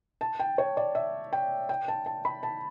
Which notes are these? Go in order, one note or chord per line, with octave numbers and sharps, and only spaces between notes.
A5
G5
C#5
D5
E5
G5
G5
A5
A5
B5
A5